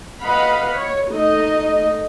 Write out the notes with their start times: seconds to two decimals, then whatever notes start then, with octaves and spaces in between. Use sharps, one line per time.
0.22 B4 D#5 F5 F#5 B5
0.73 C#5
1.09 A3 D#4 D#5